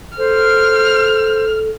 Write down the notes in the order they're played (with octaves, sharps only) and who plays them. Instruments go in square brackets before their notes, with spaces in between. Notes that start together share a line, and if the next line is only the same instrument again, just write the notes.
[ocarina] A4 [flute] C5 [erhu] F6